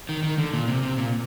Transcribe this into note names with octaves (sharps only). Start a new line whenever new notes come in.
D#3
D#3
D3
A#2
C3
C3
A#2